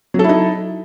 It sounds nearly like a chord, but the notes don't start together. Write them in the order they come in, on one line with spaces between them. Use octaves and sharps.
F#3 A4 E4 D#4